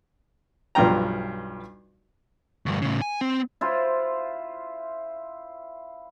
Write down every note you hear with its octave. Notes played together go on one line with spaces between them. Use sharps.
B1 G2 F3 F4 G5 A#5
D2 G2
A2 C#3
G#5
C4
E4 F4 C5